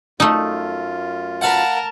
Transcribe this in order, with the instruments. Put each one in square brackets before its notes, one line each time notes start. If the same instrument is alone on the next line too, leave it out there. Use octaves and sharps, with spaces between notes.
[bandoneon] F#2 F4 [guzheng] A3 D#4
[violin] A#4 A5 [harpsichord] B4 F5 F#5